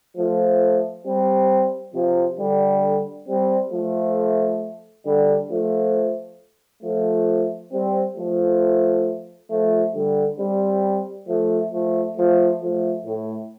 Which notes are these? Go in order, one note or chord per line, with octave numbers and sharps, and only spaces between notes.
F3 A3
G3 C4
C3 F3
D3 G3
G3 C4
F3 A3
D3 G3
F3 A3
F3 A3
G3 C4
F3 A3
F3 A3
D3 G3
G3 C4
F3 A3
F3 A3
F3 A3
F3 A3
A2